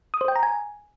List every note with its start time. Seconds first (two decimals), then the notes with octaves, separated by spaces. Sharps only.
0.14 D#6
0.21 C5
0.28 G5
0.36 A#5
0.43 G#5